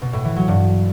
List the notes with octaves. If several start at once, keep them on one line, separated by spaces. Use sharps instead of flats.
B2
A2
E3
F#3
G2